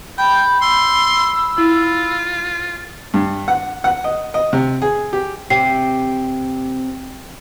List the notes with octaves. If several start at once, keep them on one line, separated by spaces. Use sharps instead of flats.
G5 B5 G6
C6 E6
E4 F4
G2
F#5
F#5
D#5
D#5
C3
G#4
G4
C3 G5 C7